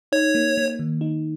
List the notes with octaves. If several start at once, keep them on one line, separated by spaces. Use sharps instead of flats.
D#4 C#5
A#3
A#3
D#3
D#4